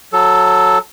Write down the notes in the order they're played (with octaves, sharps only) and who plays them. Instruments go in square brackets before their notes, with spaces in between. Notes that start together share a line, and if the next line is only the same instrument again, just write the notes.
[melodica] F#3 A4